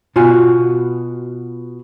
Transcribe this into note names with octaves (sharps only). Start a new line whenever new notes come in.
B2 F4 F#4 G#5